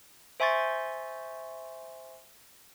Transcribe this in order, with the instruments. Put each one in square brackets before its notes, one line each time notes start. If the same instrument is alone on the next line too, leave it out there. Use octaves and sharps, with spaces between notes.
[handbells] C5 E5 G#5 C6 C#6 A6